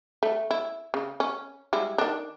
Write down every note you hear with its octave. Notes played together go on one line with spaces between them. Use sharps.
A3
E4
C#3
C#4
G3 G#3 E4
D#3 D4